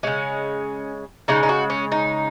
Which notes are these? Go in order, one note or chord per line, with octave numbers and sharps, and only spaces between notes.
C#3 G#3 C#4
C#3 G#3 D#4
D#4
F#4
C#4
D#4